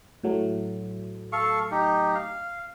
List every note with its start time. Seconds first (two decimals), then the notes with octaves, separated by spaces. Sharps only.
0.24 A2 F#3 A3
1.32 A4 F5 C#6
1.71 D#4 G4
2.15 F5